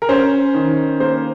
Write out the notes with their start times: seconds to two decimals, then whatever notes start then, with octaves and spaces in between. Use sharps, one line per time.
0.02 A#4
0.09 C#4 C5
0.54 D#3
1.00 A#3 C5